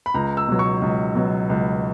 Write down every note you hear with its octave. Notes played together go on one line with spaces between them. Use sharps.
B5
C#2 A#5
E6
B2 F#3
C#6
C#2
B2 F#3
C#2